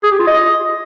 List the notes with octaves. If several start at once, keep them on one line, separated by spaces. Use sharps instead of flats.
G#4
G4
F4
D#5